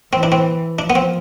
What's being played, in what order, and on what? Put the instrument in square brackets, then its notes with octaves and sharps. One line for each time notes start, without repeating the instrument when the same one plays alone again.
[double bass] E3 [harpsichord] C4
[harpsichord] D4
C4
[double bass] F3 [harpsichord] D4
[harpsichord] B3
C4